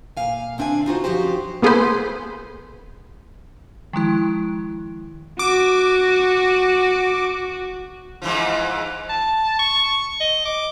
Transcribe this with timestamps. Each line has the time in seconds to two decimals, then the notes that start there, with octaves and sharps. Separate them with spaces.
0.17 A#2 F5 G#5
0.58 D2 C4 D4 E5 G#5
0.86 D#4 F4 F#4 C5
1.04 F#2 D#3 F3 F#4 G4 C5
1.62 A#3 B3 G#4 A4 B4 C5
3.93 D#3 F3 G#3 E4
5.39 F#4 D6
8.22 G#2 E3 F3
9.09 A5
9.59 C#6
10.20 D#5
10.45 D6